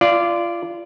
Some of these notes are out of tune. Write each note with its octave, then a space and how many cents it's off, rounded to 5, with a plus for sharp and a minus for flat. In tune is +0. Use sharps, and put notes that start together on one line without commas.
F4 -25 D5 +0